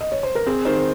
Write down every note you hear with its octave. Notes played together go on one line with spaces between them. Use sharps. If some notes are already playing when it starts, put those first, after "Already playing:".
D#5
C#5
C5
A#4
C4 G#4
D#3 C5